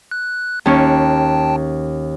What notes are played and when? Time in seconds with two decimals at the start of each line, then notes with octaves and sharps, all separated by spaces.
0.11 F#6
0.66 D#2 C#4 G5 A5 C#6